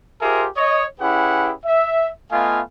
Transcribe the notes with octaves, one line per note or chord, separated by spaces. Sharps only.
F4 G4 G#4 A#4 C5 E5
C#5 D#5
C#4 E4 G4 G#4 B4 F#5
E5
A3 B3 F4 D#5 F5 G#5